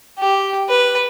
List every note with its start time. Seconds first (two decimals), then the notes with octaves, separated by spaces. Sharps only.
0.19 G4
0.69 B4